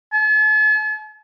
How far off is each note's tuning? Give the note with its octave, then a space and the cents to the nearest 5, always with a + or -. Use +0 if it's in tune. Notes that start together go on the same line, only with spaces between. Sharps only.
A5 -45